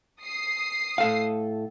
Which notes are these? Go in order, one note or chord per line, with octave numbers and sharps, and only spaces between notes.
D#6 C7
A2 A4 F5